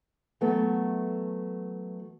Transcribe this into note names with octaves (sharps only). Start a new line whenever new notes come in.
E3 F#3 A3 B3 A4 B4